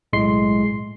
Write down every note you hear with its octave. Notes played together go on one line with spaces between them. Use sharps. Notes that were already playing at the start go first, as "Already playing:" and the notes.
B1 A2 G#3 C6 C7